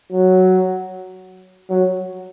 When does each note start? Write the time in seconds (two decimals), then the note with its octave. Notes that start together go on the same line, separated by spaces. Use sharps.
0.12 F#3
1.70 F#3